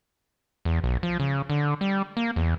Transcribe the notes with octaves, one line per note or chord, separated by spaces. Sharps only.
E2
B1
F3
C#3
D3
G3
A#3
E2